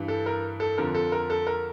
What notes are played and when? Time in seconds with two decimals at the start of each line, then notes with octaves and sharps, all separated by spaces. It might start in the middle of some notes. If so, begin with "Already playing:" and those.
Already playing: G2 E3
0.08 A4
0.26 A#4
0.60 A4
0.78 F2 D3 F3 A#4
0.95 A4
1.12 A#4
1.30 A4
1.47 A#4